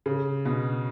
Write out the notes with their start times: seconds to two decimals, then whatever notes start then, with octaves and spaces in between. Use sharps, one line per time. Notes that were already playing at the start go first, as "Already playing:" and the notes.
0.06 C#3
0.45 B2